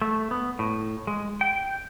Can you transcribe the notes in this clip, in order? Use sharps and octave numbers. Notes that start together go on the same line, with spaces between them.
A3
B3
A2
G#3
G5